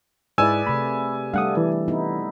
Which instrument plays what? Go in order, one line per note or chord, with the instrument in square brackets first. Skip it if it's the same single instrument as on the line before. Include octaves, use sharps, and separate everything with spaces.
[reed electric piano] G#2 G#3 E4 [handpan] G#4 B4 D5 [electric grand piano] G#5 E6
[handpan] C3 A3 [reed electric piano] B5
[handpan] G3 A3 D4 [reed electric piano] F5 F#5 D#6
[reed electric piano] E3
[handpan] B3 D#4 E4